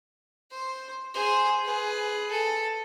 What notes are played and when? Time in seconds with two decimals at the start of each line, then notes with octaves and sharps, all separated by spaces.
0.50 C5
1.14 G#4 C5
1.65 G#4 B4
2.31 A4